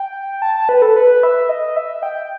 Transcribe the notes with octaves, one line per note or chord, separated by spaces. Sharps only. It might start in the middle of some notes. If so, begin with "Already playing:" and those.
Already playing: G5
A5
A5
B4
A4
B4
E5
D#5
E5
G5